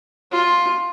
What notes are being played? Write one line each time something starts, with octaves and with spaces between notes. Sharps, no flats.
F4